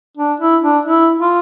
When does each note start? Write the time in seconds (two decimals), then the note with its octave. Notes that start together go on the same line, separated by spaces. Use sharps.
0.17 D4
0.40 E4
0.63 D4
0.85 E4
1.20 F4